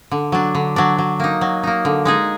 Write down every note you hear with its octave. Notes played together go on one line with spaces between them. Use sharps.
D3
F#3 D4
D3
F#3 D4
F#3
A#3 D#4
F#3
A#3 D#4
D3
G#3 D#4 G#4